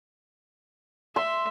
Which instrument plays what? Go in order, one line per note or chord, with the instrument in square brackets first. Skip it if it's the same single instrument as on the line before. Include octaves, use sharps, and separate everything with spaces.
[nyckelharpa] E5 [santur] C6